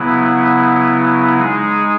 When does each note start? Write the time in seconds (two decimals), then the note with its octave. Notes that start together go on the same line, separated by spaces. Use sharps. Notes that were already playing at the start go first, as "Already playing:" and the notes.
Already playing: C#3 F#3 B3 E4
1.37 G#3 D#4 G#4